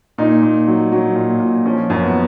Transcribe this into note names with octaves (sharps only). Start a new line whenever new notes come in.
A#2 D#4
A#2
F#3
F#3
A#2
A#2
F3 C#4
F#2
B3